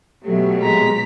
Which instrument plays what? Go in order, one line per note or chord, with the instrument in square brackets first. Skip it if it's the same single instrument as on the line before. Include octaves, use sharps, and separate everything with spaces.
[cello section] B2 F#3 [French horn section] A3 G4
[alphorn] G#3 [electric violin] A#5 B6